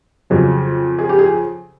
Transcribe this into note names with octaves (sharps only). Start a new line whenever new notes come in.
F2 C#3 F#3
G#4
G4
G#4